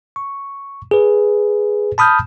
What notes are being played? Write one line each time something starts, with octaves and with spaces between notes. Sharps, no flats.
C#6
G#4 B4
A5 B5 D#6 F6 G6